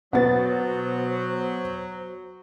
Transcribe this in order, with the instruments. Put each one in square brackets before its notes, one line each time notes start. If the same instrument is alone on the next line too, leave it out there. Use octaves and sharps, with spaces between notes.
[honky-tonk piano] B2 B3 A6 [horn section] F#3 [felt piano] B4 F#5 [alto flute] C5